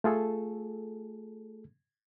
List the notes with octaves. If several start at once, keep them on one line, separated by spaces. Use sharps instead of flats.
A3 F4 G#4 A4